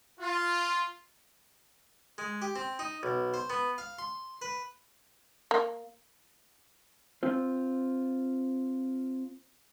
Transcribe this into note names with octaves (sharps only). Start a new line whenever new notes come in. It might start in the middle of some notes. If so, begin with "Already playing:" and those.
F4
G#3
G4
C4
D#4
B1
C5
B3
F5
C6
B4
A#3
C4 F4 C5